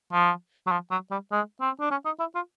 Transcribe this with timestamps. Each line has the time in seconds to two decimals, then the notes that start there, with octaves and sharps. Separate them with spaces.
0.12 F3
0.67 F#3
0.71 F3
0.91 F#3
1.11 G3
1.31 G#3
1.61 C4
1.80 D4
1.90 C#4
2.05 D#4
2.20 E4
2.35 F4